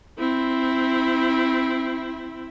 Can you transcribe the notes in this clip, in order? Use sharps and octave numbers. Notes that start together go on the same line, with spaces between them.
C4 E4